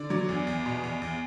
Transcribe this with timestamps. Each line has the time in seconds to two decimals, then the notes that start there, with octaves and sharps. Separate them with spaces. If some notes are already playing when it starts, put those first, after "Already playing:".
Already playing: D3 D5
0.10 F#3
0.29 E2
0.47 E2
0.66 B2
0.84 E2
1.02 E2